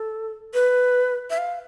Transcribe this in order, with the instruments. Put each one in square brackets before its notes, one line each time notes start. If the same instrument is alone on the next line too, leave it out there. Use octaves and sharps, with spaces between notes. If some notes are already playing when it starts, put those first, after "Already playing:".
Already playing: [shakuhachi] A4
B4
E5
F5